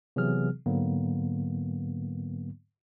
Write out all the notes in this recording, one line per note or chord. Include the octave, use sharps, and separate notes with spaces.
C3 E3 F#3 B3 G#4 F6
G#2 D3 F#3 A#3 B3